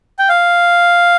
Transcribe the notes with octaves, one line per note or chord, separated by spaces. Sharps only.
G5
F5